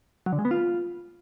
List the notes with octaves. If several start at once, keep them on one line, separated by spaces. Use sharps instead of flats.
F#3
D3
G#3
B3
F4